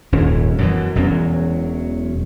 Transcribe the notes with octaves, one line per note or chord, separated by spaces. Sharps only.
D#1 D#2 G#2 C#4
F#2 B2 E3
E1 E2 F#3 C#4